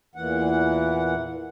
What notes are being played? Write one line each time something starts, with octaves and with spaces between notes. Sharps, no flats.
E2 A#2 E3 F#5